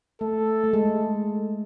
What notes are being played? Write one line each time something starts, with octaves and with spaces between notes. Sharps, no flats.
A3 A4
A3
G#3